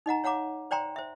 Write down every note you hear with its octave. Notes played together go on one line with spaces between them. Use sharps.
D#4 D#5 F#5 A#5
C#5 F5 F#5 A#5 D6
C5 D5 G5 A#5 C6
C5 E5